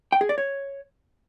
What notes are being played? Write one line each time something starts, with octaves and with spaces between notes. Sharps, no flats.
G5
G#4
D5
C#5